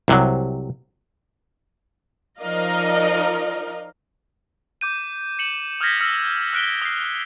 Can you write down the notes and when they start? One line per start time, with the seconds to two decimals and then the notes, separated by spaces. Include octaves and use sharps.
0.08 C2 C3 F#3
2.39 F3 D#4 A#4 D5 D#5 F5
4.81 D6 G6 D#7
5.39 C#7 E7 F#7
5.81 D#6 F6 G6 G#6 A#6 B6
6.00 E6 F6 A#6 C#7
6.53 F6 F#6 B6 D7 G7
6.82 D#6 C7